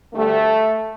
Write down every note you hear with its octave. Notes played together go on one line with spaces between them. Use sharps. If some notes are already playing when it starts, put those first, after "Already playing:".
D2 D3 G3 A3